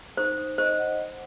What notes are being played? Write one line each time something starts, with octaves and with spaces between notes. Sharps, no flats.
D#4 C5
D#4
C5 D#5
F#5
F#5